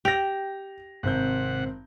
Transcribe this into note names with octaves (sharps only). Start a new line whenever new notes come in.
G4 A#6 F7
G#1 C3 C4 F#5 G6